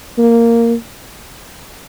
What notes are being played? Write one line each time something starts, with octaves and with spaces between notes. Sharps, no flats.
A#3